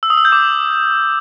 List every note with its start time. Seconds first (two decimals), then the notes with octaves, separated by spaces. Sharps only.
0.03 E6
0.10 D#6
0.18 E6
0.25 G6
0.32 D6